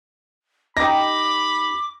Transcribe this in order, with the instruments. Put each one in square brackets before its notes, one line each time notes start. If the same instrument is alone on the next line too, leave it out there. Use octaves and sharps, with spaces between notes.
[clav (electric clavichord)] D#4 G4 [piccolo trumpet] B5 [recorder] D6 [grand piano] A#6